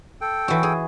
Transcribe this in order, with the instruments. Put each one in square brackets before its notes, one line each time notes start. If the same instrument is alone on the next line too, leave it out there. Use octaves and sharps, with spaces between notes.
[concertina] A4 G5
[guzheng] E3 F#4
G#4